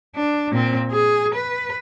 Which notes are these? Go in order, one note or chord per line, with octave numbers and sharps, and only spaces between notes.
D4
A#2 C4
G#4
B4